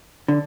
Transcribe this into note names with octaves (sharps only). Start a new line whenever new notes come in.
D3